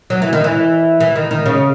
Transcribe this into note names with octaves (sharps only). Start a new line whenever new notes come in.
F#3
E3
D#3
E3
E3
D#3
D#3
C#3